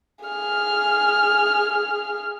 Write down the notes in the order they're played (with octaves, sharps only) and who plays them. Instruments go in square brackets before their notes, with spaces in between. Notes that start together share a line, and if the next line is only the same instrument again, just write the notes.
[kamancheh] G#4 F6